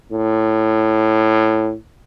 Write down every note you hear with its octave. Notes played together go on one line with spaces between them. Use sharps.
A2